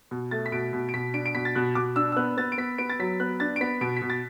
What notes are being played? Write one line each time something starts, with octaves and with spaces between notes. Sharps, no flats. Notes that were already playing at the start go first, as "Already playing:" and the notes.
B2
A3 A6
B6
B2 D7
B2
D7
B2 B6
D4 D7
D7
B2 B6
A6
B2 F#6
B2 D6
D4 E6
E6
B3 F#6
B3 A6
D7
B3 B6
B3 D7
A6
F#3 B6
B3 F#6
D4 A6
D7
B3 B6
B2 D7
B6
B2
A6